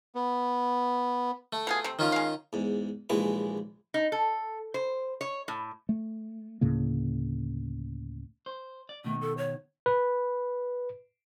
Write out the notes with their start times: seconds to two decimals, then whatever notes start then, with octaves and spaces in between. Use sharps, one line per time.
0.15 B3
1.53 A3
1.67 B2 F4 G#4
1.84 C3 C4
1.99 D#3 C#4 F4
2.12 G#3 F5
2.53 E2 G#2
3.10 A#1 D#2 E3 G#3 E4 B4
3.94 D#4
4.12 A4
4.74 C5
5.21 C#5
5.48 A2
5.89 A3
6.61 D2 A2 C#3 A#3
8.46 C5
8.89 D5
9.04 B2 D#3 A3
9.21 A4
9.38 C#5
9.86 B4